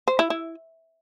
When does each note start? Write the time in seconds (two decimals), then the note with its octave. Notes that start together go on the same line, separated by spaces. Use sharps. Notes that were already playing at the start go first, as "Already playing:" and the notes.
0.08 C5
0.19 E4
0.30 E4